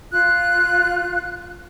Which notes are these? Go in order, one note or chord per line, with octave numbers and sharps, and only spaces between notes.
F4 F#6